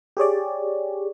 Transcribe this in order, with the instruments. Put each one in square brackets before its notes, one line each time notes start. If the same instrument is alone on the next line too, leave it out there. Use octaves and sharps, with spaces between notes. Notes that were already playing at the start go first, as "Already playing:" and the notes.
[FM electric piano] G4 G#4 C#5 D5